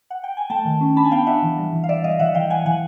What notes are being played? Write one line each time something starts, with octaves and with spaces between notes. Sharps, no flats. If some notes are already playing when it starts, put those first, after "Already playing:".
F#5
G5
G#5
A3 G5 A5
D#3
C#4
D4 A5 B5
G#5
B3 F5 G5
D4 E5 F#5
E3
G3
E3
F5
E3 D5 E5
G3 D#5 F5
E3 E5 F#5
E3 F5 G5
E3 F#5 G#5
E3 F#5 G#5